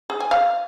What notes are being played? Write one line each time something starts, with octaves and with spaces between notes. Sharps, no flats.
G#4
G#5
F5